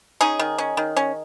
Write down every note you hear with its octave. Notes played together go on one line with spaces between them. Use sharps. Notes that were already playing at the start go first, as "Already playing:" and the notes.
C#4 D#4 G#4
D#3
C#4
D#3
C#4